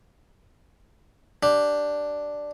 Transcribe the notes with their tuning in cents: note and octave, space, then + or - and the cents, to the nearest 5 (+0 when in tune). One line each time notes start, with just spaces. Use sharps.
D4 +0 G4 +0